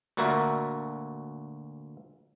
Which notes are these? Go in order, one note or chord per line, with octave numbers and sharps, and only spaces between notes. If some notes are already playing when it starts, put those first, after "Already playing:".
D2 A#2 F#4 A#4 D5 E5